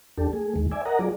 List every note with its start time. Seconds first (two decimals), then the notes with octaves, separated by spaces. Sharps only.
0.18 E2 D4 G4 A4
0.33 A3 G#4
0.56 D#2 D#3 G#3
0.71 D5 E5 G#5
0.85 A#4 D#5 F#5 A#5
0.99 F#3 F4 G#4 D5